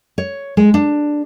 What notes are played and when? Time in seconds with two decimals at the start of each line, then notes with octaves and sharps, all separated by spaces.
0.18 C#5
0.57 G#3
0.74 D4